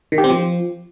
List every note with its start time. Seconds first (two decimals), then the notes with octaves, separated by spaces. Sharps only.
0.12 D#3
0.18 G4
0.24 C4
0.30 F3